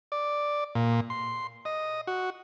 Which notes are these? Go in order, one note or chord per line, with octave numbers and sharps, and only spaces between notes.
D5
A#2
C6
D#5
F#4